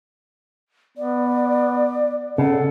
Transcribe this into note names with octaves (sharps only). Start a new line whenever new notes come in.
B3 D5
C#3 A4 F#5